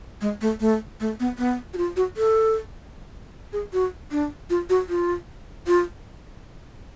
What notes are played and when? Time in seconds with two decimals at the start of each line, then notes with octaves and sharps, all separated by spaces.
0.21 G#3
0.41 A3
0.60 A3
1.00 A3
1.20 B3
1.38 B3
1.74 F#4
1.78 F4
1.96 F#4
2.17 A4
3.53 G#4
3.73 F#4
4.11 D4
4.50 F4
4.70 F#4
4.89 F4
5.67 F4